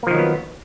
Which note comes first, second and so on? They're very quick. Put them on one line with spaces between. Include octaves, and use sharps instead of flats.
A#3 F3 D#3 F#3 B3